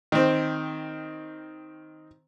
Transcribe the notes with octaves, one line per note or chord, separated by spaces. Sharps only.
D#3 C4